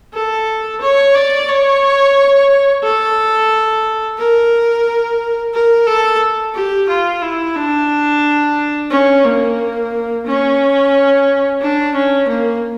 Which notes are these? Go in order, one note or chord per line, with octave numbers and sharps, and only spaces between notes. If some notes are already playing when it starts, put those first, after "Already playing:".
A4
C#5
D5
C#5
A4
A#4
A#4
A4
G4
F4
E4
D4
C#4
A#3
C#4
D4
C#4
A#3